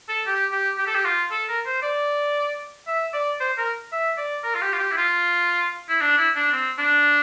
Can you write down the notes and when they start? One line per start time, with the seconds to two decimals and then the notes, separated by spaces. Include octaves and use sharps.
0.09 A4
0.27 G4
0.52 G4
0.78 G4
0.87 A4
0.95 G4
1.05 F4
1.31 A4
1.49 A#4
1.66 C5
1.83 D5
2.87 E5
3.14 D5
3.40 C5
3.58 A#4
3.92 E5
4.18 D5
4.44 A#4
4.55 F4
4.62 G4
4.73 F4
4.79 G4
4.92 E4
4.97 F4
5.89 E4
6.01 D4
6.17 E4
6.36 D4
6.52 C4
6.79 D4